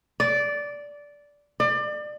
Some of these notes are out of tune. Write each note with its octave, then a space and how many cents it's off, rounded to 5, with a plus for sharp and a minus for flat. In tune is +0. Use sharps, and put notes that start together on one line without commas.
D5 -10
D5 +30